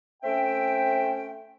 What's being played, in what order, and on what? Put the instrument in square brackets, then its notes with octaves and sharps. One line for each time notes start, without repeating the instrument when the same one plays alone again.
[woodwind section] A3 C4 C#4 E5 G5